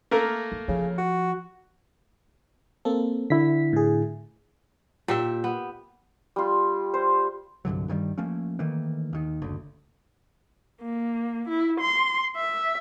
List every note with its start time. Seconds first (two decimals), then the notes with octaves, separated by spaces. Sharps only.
0.11 A3 A#3 A#4
0.52 G3
0.68 C#3 F3
0.98 F#4
2.85 A#3 C4 A4
3.30 D3 E4 B6
3.73 A2 G#4
5.08 A#2 G4 E5
5.44 B3
6.36 G3 F4
6.94 C5
7.65 C2 G2 D3 F#3
7.88 G2 D#3 F3 G3
8.18 F3 A3 A#3 C#4
8.59 D#3 E3 A3 A#3
9.13 D#2 D#3
9.42 F#1 D2
10.82 A#3
11.48 E4
11.81 C6
12.37 E5